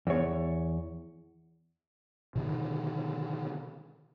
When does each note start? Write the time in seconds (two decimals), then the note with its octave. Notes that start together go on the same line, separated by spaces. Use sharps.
0.07 E2 C#5
2.35 B2 D3 D#3